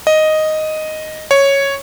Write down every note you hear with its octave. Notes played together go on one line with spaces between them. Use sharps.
D#5
C#5